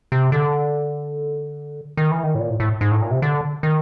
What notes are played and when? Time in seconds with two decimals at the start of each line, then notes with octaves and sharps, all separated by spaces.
0.12 C3
0.32 D3
1.97 D#3
2.11 E3
2.24 D#3
2.35 A2
2.39 A#2
2.50 A2
2.60 A2
2.81 G#2
2.91 A2
3.01 A#2
3.11 C3
3.22 D3
3.63 D#3